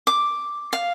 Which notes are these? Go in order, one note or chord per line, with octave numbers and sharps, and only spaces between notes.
D6
F5